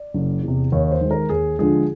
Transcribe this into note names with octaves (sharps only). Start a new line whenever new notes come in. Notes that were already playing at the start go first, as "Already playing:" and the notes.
Already playing: D5
F#1
E2 C3
D#2 C#5
C5
D#3 G#3
A#4
D#2 G#4
D3 F3 G#3 G#4